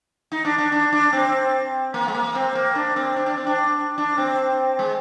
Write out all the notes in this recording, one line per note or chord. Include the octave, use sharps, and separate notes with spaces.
D#4
D4
D4
D4
D4
C4
A#3
G#3
A#3
C4
A#3
D4
C4
D4
D4
C4
D4
D4
C4
G#3